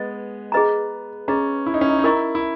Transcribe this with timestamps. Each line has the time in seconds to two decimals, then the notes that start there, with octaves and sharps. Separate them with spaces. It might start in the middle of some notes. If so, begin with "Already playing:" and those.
Already playing: G#3 B3 B4 D#5
0.52 G#4 B4 D#5 A#5
1.28 C#4 G#4 B4 D#5 A#5
1.66 E4
1.74 D#4
1.81 C#4
1.89 D#4
1.99 D#4
2.04 E4 A#4 D#5 A#5 C#6
2.35 E4